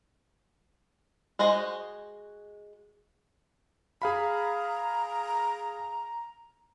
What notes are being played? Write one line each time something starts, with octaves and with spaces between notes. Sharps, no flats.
G#3 F#4 C5 D#5
G#4 F5 A#5 B5